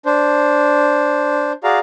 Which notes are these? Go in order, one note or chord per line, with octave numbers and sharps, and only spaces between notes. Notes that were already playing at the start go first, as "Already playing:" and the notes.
D4 C5
F#4 G#4 D5 F5 A#5